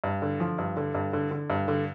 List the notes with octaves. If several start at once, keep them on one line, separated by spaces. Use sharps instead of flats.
G2
D3
F3
G2
D3
G2
D3
D3
G2
D3